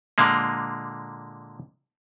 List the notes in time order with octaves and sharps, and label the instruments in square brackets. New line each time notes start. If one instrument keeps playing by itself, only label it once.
[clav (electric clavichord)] A#2 D3 G#3 A#3